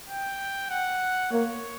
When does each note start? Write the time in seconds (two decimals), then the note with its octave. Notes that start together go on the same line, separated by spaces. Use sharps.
0.08 G5
0.70 F#5
1.32 A#3 C#5